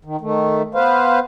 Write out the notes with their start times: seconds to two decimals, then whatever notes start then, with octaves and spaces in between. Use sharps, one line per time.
0.05 D#3
0.21 D#3 A3
0.74 B3 B4 C5 F5